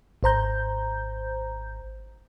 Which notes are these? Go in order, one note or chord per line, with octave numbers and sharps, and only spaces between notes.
G#1 C5 A#5 G6